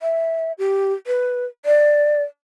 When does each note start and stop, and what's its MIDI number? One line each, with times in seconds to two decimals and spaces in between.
0.01 0.52 76
0.59 0.93 67
1.07 1.46 71
1.65 2.22 74